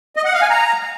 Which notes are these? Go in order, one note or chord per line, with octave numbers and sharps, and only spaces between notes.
D#5
F#5
F5
G#5
A#5